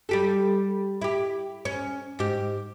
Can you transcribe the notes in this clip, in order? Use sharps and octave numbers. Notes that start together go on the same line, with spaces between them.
G3 G4 A4
E4 G4
C#4
G#2 G4